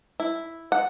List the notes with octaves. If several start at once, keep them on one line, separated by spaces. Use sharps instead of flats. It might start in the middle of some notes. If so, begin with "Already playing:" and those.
E4
F#5